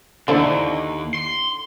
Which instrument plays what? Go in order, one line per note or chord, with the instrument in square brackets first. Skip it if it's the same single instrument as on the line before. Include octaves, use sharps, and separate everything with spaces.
[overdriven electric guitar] D#2 [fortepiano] D3 E4 [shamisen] D4 C5 D5
[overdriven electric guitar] C6